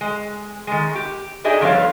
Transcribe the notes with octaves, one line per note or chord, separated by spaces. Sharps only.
G#3
D#3 G#3
G4
D4 D#4 G4 G#4 D#5 E5
G2 F3 B3 A4 C#5 F5